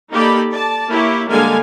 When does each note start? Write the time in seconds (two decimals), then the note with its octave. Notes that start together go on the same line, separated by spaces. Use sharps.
0.12 A#3 D#4 G4 A4 D5 B5
0.53 D5 A5
0.90 A#3 E4 G4 C#5
1.30 D3 G3 G#3 A#3 F5 G#5